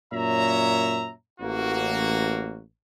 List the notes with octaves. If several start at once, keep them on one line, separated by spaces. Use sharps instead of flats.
F#2 A#2 C#5 E5 A#5
A1 A#3 F#4